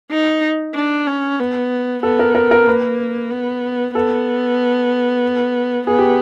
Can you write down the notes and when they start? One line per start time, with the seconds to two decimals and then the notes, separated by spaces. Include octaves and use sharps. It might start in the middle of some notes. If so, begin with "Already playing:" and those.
0.11 D#4
0.76 D4
1.07 C#4
1.39 B3
2.03 B3 A4
2.19 A#4
2.35 A#4
2.51 A#4
2.67 A#3 B4
3.31 B3
3.95 B3 A4
5.87 B3 G#4
5.99 G4